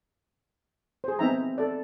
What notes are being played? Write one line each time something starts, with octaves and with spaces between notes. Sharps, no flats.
G#4 C5
B3 C4 D#4 E5 G5 A#5
A4 D5